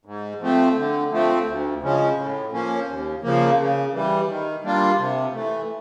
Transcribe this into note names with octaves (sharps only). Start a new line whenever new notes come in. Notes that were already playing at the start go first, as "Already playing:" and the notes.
G#2
F3 A3 C4
D3
F3 A3 C4
D2
C#3 F3 G#3 C#4
A2
F3 A#3 C#4
D#2
C#3 F3 A#3
C#3
E3 G3
D#3
G3 A#3 D4 F4
C3
E3 A3